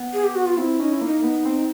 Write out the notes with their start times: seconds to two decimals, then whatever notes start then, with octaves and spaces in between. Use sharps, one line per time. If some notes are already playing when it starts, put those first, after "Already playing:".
Already playing: B3
0.13 G#4
0.24 G4
0.35 F#4
0.46 F4
0.57 C4 E4
0.79 C#4 D#4
0.93 E4
1.01 A#3 D#4
1.23 B3
1.45 C4